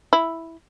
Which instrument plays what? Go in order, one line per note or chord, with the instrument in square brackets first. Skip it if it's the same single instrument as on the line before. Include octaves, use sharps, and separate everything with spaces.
[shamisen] E4